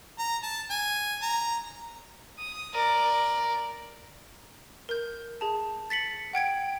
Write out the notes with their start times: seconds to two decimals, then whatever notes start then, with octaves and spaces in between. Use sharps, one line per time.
0.19 A#5
0.43 A5
0.70 G#5
1.22 A#5
2.39 D#6
2.73 A#4 D5
4.89 A#4 G6
5.41 G#4 A5
5.90 A6 B6 C#7 F#7
6.33 F#5 G5 G#6 D7